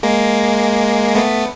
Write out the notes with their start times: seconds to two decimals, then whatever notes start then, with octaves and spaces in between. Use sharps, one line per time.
0.03 G#3 A#3
1.15 A3 B3